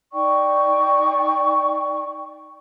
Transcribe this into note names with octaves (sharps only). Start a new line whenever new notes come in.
D#4 D5 G5 C#6